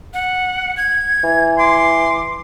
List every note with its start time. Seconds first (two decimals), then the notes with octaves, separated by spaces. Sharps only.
0.14 F#5
0.77 G#6
1.24 E3
1.58 C6 D6